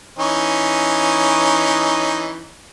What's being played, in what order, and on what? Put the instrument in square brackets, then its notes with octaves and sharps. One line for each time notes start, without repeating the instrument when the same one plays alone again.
[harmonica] E3 C#4 D#4